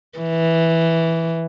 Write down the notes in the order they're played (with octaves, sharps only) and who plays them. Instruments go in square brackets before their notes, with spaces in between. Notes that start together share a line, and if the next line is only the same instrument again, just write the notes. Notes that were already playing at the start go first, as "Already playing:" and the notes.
[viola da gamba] E3